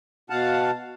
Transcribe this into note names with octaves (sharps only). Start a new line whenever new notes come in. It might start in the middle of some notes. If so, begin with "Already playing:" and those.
B2 F5 F#5 A5